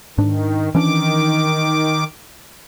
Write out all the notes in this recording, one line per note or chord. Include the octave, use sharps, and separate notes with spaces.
G#2 D#3 D4
D#3 E3 C#4 D4 D6